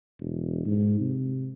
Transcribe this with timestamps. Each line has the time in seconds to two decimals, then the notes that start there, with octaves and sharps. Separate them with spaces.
0.19 E1
0.65 G#2
1.00 C3